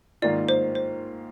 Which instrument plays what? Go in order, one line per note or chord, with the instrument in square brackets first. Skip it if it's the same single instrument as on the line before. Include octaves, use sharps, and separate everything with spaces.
[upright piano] G#2 D#3 A#3 F4 [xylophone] D5
[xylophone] C5
C5